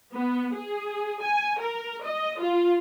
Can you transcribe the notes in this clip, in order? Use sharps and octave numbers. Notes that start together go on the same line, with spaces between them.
B3
G#4
G#5
A#4
D#5
F4